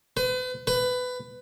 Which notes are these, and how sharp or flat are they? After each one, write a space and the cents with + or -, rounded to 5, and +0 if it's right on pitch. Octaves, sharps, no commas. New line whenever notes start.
B4 +40
B4 +20